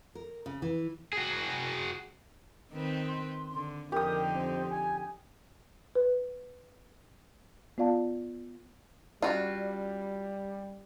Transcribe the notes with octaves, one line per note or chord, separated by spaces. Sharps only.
A#4
C#3
E3
F#4 G#4
D#3 C4 B4
C6
D3
F2 D3 D#4 G4 A#4 D#6
C4
G#5
B4
B3 F4 D5 F5 A5
G3 C#4 F4 F#4 D5